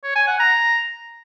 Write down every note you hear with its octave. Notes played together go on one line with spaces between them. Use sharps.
C#5
G#5
F#5
A#5